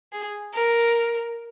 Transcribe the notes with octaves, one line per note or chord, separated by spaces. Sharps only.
G#4
A#4